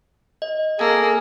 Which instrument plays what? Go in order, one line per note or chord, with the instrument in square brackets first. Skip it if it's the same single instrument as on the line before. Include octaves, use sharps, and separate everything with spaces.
[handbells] D#5
[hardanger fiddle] A#3 [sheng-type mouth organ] G#4 [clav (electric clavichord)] A4 G#5